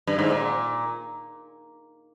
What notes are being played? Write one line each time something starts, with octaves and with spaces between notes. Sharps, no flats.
G2
G#2
A#2